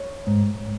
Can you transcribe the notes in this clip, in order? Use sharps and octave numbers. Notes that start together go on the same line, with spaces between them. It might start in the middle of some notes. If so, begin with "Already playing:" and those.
Already playing: C#5
G#2